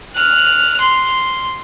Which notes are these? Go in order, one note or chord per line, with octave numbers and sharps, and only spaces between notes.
F6 F#6
C6